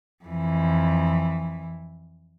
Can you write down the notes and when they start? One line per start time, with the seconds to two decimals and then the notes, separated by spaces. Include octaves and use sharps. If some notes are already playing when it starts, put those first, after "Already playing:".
0.25 F2 E3